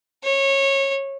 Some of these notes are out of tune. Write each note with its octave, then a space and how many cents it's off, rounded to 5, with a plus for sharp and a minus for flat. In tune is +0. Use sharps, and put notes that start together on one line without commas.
C#5 -20